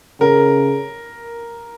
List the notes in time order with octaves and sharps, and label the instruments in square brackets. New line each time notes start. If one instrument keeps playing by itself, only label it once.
[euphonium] C#3 [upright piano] A#4